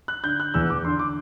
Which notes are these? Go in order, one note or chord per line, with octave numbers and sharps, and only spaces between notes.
F#6
D3 G6
F#6
E2 E6
D6
D3 C6
D6